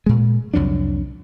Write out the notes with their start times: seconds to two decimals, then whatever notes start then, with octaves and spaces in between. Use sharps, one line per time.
0.06 A#2 G#3
0.54 C2 F2 F#3 D4